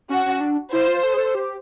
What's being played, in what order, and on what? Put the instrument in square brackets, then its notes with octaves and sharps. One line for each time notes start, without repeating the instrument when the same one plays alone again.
[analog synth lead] C#4 [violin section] F#4
[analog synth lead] C#4
D4
[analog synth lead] E4 [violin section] C5
[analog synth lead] F4
A4
G#4
A4
G4